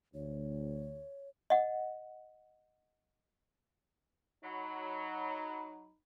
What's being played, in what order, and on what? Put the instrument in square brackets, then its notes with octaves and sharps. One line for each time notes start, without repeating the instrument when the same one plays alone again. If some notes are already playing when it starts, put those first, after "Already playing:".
[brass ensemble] D2 [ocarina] C#5
[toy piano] D#5 F#5
[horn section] F#3 [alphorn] D#4 [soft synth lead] B5